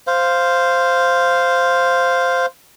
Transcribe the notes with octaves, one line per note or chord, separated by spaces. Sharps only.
C5 F5